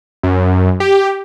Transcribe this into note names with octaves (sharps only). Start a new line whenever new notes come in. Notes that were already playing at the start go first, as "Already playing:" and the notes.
F#2
G4